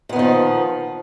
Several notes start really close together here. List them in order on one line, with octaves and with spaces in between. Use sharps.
A#2 B3 D#3 F3